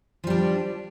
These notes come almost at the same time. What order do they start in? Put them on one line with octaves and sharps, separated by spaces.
F3 G3 D4